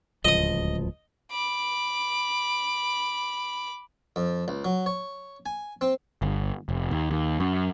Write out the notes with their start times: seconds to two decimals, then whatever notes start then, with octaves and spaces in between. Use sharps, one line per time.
0.25 D1 C#2 F3 D#5 D#6
1.31 B5 D6
4.16 F2
4.48 C#2
4.65 F#3
4.86 C#5
5.46 G#5
5.81 C4
6.22 G1
6.69 F1
6.91 D#2
7.10 D#2
7.40 F#2